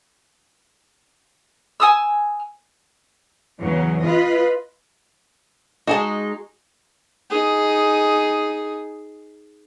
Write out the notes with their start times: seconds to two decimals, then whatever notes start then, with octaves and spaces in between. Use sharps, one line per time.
1.80 G#5 D#6 E6
3.60 E2 C#3 F#3
4.02 F4 B4 D#5
5.87 G#3 D#4 F#4 G#4 A5
7.30 D#4 G#4